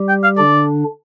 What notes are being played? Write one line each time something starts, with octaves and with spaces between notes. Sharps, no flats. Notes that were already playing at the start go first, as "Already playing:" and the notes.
Already playing: G3 G4
G5
F5
D3 D4 D5